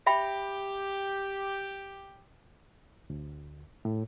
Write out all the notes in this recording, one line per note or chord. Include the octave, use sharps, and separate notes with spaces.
G4 E5 G5 B5
D2
A2